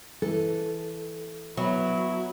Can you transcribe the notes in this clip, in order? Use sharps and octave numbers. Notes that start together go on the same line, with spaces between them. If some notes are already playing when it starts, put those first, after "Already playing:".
E3 A4
F#3 B3 E4